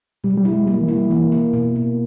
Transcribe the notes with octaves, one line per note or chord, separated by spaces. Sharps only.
B2 G3
G3
E4
G#3
G3 A#3
E3
E4
G3
E3 A#3
A#3
B2
B2